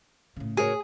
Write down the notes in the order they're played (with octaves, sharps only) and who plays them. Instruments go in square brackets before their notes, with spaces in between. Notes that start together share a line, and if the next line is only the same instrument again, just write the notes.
[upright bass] A2 C#3
[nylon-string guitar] F#4 A#4 C#5 [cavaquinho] G#4 [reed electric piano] G#5